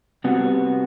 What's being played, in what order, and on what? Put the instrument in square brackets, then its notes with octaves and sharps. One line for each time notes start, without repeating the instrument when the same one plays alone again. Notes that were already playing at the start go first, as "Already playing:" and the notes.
[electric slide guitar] C3 G3 B3 F#4